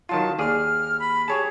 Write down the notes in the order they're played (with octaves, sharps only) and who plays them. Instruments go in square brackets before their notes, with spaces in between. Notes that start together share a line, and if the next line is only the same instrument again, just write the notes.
[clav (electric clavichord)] D#3 F#3 F4 [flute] A5
[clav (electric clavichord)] D#2 G#4 D5 [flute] F6
[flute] B5
[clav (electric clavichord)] G4 C#5 A5 [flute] G#4